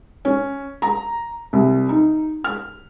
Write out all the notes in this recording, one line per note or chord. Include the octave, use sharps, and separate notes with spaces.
C#4
A#5
C2
D#4
F6